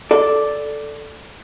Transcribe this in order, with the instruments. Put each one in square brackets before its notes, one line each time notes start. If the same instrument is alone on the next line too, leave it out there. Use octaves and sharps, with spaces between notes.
[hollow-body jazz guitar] A4 D5